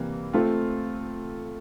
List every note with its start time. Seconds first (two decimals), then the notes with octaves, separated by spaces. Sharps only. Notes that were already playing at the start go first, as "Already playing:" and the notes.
Already playing: C3 E3 G3 A#3
0.33 A3 C4 F4